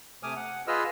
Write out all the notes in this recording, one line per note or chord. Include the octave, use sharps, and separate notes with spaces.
C3 A3 G#5 D6 D#6 F6
F#5
F4 G#4 B4 D#5 E6 F6